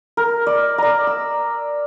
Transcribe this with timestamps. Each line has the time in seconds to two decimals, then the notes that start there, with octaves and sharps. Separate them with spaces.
0.17 A#4
0.47 D5
0.78 D5 A#5
1.07 E6